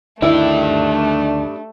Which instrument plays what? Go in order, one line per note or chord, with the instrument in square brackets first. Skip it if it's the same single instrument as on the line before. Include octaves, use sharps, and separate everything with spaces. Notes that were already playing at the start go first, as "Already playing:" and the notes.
[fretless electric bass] D2 D#3 [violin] A3 [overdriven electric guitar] D4 G4 [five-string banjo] E4